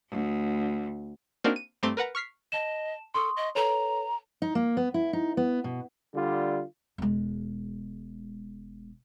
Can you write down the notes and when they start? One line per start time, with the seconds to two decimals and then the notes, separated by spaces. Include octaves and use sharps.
0.10 D2
1.44 A#3 C4 D4 D#4 F#4 A#4
1.56 D#7
1.83 G2 A3 C4 A#5 C6 D6
1.97 A#4 B4 F#5 A#5
2.15 C#6 F6 B6 C7
2.52 D#5 A5 E7
3.14 A4 C6 C#6 D#6
3.37 D#5
3.55 A4 B4 C#5 A#5
4.42 D#4
4.55 A#3
4.77 B3
4.94 E4
5.13 D#4
5.37 B3
5.64 B2
6.14 D3 G3 F4
6.98 E1 G#3